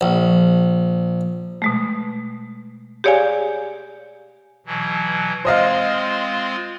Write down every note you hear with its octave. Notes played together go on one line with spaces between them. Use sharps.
A#1
B2 G#3 A3
G4 G#4 C#5 D5 F5 G#5
B2 E3 F#3
G#3 C4 F4 C5 D#5 F5